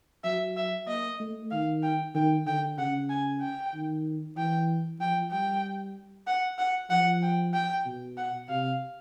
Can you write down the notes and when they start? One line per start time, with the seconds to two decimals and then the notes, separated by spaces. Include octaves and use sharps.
0.24 F#3 E5
0.57 E5
0.88 A#3 D#5
1.20 A3
1.51 D#3 F5
1.83 G5
2.14 D#3 G5
2.46 D3 G5
2.78 C#3 F#5
3.10 G#5
3.41 G5
3.74 D#3
4.37 E3 G5
5.00 F3 G5
5.31 G3 G5
6.27 F#5
6.58 F#5
6.90 F3 F#5
7.23 G5
7.54 G5
7.85 B2
8.18 F#5
8.49 C3 F5